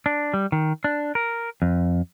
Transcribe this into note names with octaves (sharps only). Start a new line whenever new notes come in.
D4
G3
D#3
D4
A#4
F2